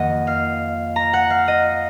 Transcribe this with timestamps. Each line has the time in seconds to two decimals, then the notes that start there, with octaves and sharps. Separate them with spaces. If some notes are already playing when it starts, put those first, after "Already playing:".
Already playing: F2 D#3 A#3 D#5 F#5
0.27 F5
0.96 A#5
1.13 F#5
1.30 F5
1.48 D#5